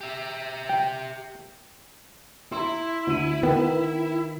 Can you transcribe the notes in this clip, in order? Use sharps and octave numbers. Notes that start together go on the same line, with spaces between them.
G4 E5
G5
E4 A#5 C6
D2 D#7
D#3 B3 A#4 G5